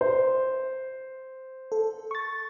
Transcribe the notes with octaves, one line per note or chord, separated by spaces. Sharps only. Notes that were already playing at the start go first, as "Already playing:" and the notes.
C5
A4
C#6 A6